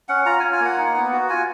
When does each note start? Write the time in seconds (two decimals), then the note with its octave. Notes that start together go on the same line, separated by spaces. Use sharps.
0.09 C#4 F#5
0.26 F4 A#5
0.39 G#5
0.43 F4
0.53 G#5
0.60 A#3 F#5
0.78 D#4
0.96 B3
1.12 F#4
1.29 F4 G#5